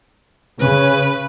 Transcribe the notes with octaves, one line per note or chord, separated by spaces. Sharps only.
C#3 B4